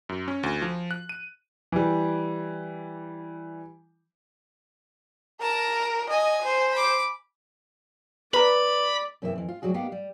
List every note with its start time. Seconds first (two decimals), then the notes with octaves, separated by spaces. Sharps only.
0.09 F#2
0.28 C#4
0.43 D2
0.62 F3
0.91 F#6
1.09 D#7
1.72 E3 G3
5.41 A#4 A5 A#5
6.10 D#5 G#5
6.42 C5
6.72 B5 D6
8.34 B4 D5 A#5 B5
9.22 F#2 C3 E3 A#3 C5 E5
9.35 F2 E3
9.48 F4
9.62 D2 G#2 F#3 G3 F#4 G#4
9.74 A#3 B3 D#4 G4 F5 F#5
9.92 G3